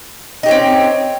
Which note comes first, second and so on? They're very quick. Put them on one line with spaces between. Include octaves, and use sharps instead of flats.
D#4 G4 C#4 C4